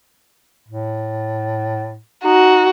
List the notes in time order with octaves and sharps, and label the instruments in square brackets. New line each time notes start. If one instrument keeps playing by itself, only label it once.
[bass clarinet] A2
[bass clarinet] D#4 [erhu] F#4